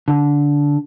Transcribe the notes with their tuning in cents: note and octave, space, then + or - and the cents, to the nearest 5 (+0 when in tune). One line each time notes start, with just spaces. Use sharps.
D3 -15